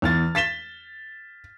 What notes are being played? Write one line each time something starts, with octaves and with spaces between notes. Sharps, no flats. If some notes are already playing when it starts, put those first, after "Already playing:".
E2 F6 A6
A6 B6 E7 G7